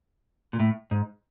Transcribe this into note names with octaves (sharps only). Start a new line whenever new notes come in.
A#2
A2
G#2